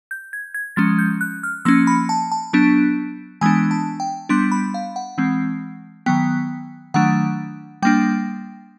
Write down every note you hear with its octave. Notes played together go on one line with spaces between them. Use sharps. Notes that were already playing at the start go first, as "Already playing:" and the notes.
G6
G#6
G#6
F3 G#3 C#4 A6
G6
F#6
F6
F3 A#3 C#4 E6
B5
A5
A5
F#3 B3 D4
E3 G#3 B3 D4 G#5
A5
G5
G3 B3 D4 C6
B5
F5
F#5
E3 G#3 C4
D#3 F#3 B3 G5
D#3 F#3 A3 D4 F#5
G3 A#3 D4 G5